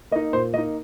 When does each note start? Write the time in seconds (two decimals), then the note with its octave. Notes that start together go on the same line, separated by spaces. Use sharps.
0.11 A#3 D#5
0.16 D#4
0.33 A#2 C5
0.54 A#3 D#4 D#5